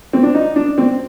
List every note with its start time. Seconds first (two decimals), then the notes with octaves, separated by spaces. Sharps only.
0.13 C4
0.23 D4
0.35 D#4
0.56 D4
0.78 C4